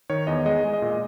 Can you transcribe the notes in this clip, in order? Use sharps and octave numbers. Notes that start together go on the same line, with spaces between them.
D#3 C#5
E2 D#5
G#3 D#5
G#3
D#5
A#2